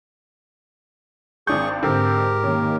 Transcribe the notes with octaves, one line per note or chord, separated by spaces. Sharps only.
G#1 D4 G#4 C#6 G6
G#2 D3 C4 G4 A#4
D#3 A#3 C#4